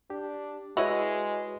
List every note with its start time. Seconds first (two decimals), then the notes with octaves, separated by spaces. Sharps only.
0.10 D4 G4
0.77 G#3 E4 F#4 B4 C#5 D#5